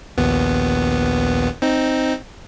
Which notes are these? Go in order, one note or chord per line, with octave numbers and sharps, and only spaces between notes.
A#1 D#2 B3
C4 D#4